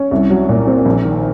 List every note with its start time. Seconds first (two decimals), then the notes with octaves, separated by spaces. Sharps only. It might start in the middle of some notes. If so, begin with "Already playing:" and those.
Already playing: C#4
0.11 C2
0.30 F#3
0.49 A#2
0.67 C4
0.86 A#1
1.05 D#3